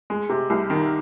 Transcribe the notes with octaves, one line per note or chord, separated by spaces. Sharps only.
G#3
C3
C2
D#3